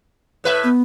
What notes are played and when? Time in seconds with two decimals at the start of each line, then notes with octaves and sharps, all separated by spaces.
0.44 A2 B4 E5
0.64 B3